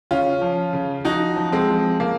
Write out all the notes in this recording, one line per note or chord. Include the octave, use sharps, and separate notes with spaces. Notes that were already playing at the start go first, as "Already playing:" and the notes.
C#3 C#4 F4
F3
C#3
F3 D#4 F#4
F3
G#3 C4
F3
C#3 A#3